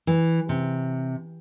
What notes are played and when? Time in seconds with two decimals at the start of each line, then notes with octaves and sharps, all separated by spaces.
0.07 E3
0.49 C3